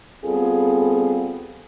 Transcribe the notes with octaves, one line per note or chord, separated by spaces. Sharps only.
G3 B3 C4 F4 G#4 A4